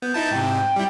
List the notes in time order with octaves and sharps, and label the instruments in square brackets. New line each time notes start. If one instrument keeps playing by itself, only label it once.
[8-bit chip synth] B3 [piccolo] G6
[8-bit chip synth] D#4 E4 A5
[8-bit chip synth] G#2 C3 [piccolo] G5
[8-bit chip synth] G3 E4